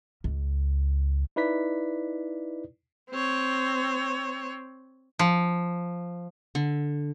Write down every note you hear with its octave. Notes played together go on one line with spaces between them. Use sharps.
C#2
D#4 E4 B4 D5 B6
C4 C#5
F3
D3